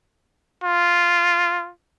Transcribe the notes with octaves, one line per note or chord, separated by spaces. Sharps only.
F4